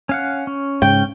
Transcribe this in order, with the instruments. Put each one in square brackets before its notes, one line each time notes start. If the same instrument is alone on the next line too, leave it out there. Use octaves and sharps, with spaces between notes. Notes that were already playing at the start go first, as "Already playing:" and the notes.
[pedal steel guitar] C#4 F5 F#5
C#4
[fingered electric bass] G#2 C#3 [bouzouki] G5